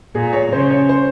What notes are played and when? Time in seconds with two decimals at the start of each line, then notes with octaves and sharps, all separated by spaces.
0.15 A#2 G#4
0.33 C#5
0.52 C#3 C5
0.70 C#5
0.89 C5